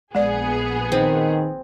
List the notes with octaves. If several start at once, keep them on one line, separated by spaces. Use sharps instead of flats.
A#1 G#3 B3 G#4 D5
D#3 C4